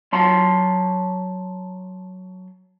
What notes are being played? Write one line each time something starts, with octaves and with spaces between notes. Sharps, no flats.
F#3 A5 C6